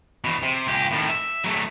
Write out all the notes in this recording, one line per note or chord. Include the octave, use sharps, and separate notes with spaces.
E2 B2
C3
C#2 G4
A2 D#3
E5
F#3 A3